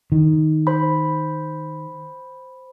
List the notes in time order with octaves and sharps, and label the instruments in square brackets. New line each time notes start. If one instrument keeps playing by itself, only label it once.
[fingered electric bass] D#3
[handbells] C5 B5